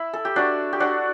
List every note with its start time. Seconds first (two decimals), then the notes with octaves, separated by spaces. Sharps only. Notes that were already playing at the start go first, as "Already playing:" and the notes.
Already playing: E4
0.13 A4
0.25 G4
0.36 D4 F#4
0.73 G4
0.80 D4 F#4